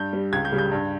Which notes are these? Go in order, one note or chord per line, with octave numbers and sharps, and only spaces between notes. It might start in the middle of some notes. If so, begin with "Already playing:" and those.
Already playing: G2 G6
G3
C#2 G#6
G6
C#3 G3
G6
G2